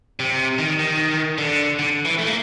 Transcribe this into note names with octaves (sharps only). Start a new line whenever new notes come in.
C3
D#3
D#3
D3
D3
E3
A3
A#3